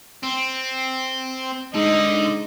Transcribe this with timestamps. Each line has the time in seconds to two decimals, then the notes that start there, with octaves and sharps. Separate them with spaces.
0.23 C4
1.75 G#2 D3 D#4